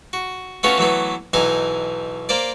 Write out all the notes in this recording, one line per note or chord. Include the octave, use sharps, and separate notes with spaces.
F#4
A3 B3 C#4 F4 F#4
E3 F#3 A3 B3
B1 E3 D#4 G#5
A#3 C5 D5